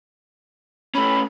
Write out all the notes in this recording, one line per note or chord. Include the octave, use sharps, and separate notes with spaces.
A3 C#4 B5